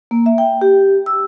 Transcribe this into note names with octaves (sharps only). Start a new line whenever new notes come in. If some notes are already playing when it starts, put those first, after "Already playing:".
A#3
E5
G5
G4
E6